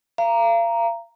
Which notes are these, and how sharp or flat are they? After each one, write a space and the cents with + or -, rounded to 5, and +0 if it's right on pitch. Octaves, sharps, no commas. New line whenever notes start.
F5 -35 A#5 +0